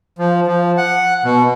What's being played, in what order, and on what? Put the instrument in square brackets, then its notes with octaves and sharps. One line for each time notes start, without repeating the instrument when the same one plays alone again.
[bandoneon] F3
F3
F#5
B2